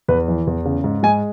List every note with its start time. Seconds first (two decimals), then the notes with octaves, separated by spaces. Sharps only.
0.08 E2 B4
0.28 E3
0.47 E2
0.65 C#3
0.84 G#2
1.03 G#3 G#5